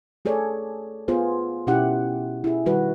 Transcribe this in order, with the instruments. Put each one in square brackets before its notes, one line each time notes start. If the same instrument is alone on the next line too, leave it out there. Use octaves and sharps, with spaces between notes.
[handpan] A3 G#4 A4 C#5 D5
B3 F4 G#4 C5
B2 C#4 E4 G4 F#5
E4 G#4
D#3 G3 F#4 B4